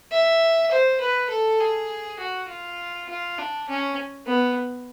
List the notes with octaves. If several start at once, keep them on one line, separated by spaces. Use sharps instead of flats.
E5
C5
B4
A4
G#4
F#4
F4
F4
D4
C#4
B3